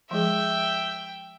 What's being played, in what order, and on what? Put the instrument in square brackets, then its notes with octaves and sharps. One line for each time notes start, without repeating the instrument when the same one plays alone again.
[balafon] F3 G#3 G#4 [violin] E5 G5